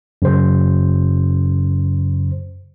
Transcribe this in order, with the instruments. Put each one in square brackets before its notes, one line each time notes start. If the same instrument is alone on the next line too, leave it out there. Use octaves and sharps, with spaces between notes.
[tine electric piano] F#2 C#3 C5